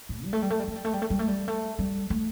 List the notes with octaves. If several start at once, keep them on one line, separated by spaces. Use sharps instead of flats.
A2
G3
A3
G3
A3
G3
A3
G3
A3
G3
A3
G3
A3
G3
A3
G3
A3